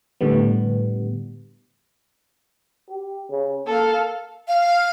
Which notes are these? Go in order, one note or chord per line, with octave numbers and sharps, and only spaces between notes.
A2 D3 G3 B3
G4
C#3
A#3 A4 F5
F5